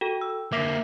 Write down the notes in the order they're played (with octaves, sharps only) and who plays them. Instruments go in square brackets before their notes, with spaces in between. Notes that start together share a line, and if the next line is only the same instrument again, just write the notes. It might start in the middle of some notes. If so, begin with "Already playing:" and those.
[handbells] F#4 A4 [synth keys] G5
[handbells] E6
[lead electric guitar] D3 A#3 [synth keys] E5 [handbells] D6 A#6 B6